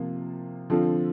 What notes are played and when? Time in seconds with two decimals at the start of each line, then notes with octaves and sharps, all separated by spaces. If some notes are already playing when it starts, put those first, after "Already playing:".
Already playing: C3 F3 A#3 F4
0.70 D3 F3 C4 F4 A4